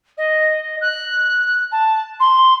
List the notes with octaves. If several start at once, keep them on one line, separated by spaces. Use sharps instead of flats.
D#5
F#6
A5
C6